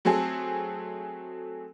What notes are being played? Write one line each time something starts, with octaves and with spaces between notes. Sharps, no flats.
F#3 A3 C4 G#4 A4